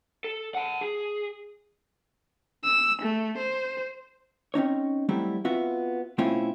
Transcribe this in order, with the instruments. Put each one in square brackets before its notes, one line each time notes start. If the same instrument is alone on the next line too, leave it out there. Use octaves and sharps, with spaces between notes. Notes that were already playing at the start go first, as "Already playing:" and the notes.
[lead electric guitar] A4
F#5 A5
G#4
[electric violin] E6
A3
C5
[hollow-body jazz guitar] C4 C#4 D#4 C#5
F#3 G3 A3 C4 E4
B3 C4 F4 F#4 E5
B2 A3 C4 C#4 E4 F4